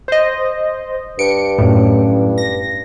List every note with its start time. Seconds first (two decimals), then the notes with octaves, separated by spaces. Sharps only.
0.08 C5 D#5
1.19 G2 C#7 D7
1.58 F#2 A2
2.38 A#6